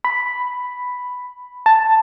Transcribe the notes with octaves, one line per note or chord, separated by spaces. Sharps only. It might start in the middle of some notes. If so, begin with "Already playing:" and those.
B5
A5